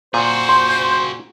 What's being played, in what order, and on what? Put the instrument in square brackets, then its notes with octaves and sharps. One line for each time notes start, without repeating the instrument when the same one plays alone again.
[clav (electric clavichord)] A#2 [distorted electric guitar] F#4 G#4 [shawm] C5
[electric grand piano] C6